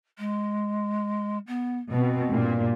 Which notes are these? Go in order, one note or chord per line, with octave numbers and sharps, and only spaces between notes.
G#3
B3
B2 C4
G2 A#2